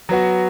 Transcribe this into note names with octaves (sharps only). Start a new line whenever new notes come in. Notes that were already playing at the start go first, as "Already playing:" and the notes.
F#3 B3 F#4